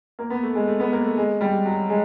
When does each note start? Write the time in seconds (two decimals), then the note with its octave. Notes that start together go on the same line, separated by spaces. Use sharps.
0.19 A#3
0.30 B3
0.43 A3
0.55 G#3
0.67 A3
0.80 B3
0.92 A#3
1.05 A3
1.17 G#3
1.41 G3
1.66 F#3
1.90 G#3